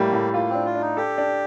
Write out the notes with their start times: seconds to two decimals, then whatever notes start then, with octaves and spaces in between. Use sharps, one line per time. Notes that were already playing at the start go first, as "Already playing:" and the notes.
Already playing: A2 G3 A#3
0.13 A2
0.34 A#3 F4
0.50 C4
0.55 D4
0.65 F4
0.75 D4
0.81 D#4
0.97 G4 A4
1.18 D4